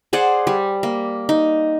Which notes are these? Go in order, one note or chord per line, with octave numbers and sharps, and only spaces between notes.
G#4 C5 D5 F#5
G3
A#3
D#4